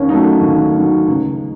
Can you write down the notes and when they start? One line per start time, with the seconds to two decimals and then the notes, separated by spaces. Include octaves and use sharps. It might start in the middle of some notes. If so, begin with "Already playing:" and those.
Already playing: D#2 C#4
0.08 D#3 F#3 A3 D#4
0.41 D#2
0.74 D#3 F#3 A3
1.07 C#2